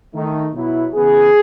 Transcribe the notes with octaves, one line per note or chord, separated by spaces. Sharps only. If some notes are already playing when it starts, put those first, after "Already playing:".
D#3 A3 D#4
B2 F#3 B3 E4
C#3 E3 B3 G#4